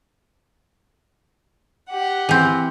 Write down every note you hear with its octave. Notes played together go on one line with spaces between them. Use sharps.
G4 F#5
E3 C4